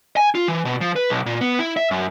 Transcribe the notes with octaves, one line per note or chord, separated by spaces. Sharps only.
G#5
F4
E3
B2
F3
B4
B1
A#2
B3
E4
E5
F#2